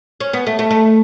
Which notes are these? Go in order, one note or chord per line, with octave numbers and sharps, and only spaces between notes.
C#4
B3
A3
A3
A3